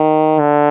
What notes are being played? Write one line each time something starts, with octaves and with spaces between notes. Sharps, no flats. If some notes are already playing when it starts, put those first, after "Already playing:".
Already playing: D#3
D3